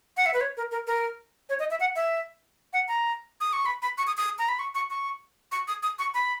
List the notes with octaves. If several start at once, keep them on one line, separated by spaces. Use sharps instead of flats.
F#5
E5
B4
C#5
A#4
A#4
A#4
C#5
D#5
E5
F#5
E5
F#5
A#5
D#6
C#6
B5
B5
C#6
D#6
D#6
A#5
B5
C#6
C#6
C#6
C#6
D#6
D#6
C#6
B5